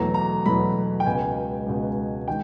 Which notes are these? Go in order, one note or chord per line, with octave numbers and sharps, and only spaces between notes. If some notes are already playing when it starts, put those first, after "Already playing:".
Already playing: E2 B2 F#3 A3 A#5
A#5
E2 B2 F#3 A3 B5
G5
C#2 B2 G#3 G#5
C#2 B2 G#3
D#3 G#3 G5